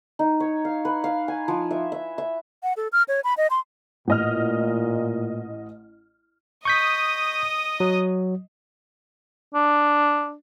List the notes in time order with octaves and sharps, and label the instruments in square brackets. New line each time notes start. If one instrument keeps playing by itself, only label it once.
[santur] D#4
C#5
F5
B4
F5
G#5
F3
E5
E5
E5
[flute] F#5
A4
F6
C#5
B5
D#5
C6
[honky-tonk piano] A1 D#5 F6 [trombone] A#2
[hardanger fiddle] D#5 D#6 [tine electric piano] C#6 G6 B6
[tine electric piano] F#3
[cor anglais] D4